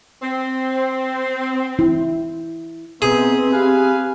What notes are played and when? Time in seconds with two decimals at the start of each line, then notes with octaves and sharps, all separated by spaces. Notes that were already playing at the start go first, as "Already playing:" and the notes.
0.21 C4
1.79 E4
3.02 B3 C4 D#4 G#4 C5 E5
3.53 G4 B4 F5 G#5